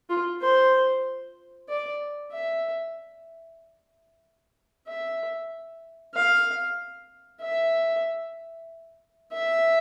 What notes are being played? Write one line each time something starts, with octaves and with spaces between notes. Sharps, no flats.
F4
C5
D5
E5
E5
F5
E5
E5